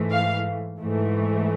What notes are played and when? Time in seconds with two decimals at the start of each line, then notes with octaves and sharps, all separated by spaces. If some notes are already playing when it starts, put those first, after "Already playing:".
Already playing: G#2 E3 A3
0.11 F5
0.80 G#2 E3 A3